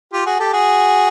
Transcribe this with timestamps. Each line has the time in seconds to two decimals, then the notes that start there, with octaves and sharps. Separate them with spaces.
0.13 F4 G4
0.26 F#4 G#4
0.39 G4 A4
0.53 F#4 G#4